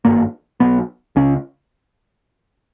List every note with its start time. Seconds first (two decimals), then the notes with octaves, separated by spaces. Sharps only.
0.05 G#1 G2 A#3
0.60 B1 B2 B3
1.16 C#2 C#3 C#4